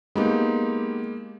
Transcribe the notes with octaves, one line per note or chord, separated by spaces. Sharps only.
G#3 A#3 B3 D#4 G4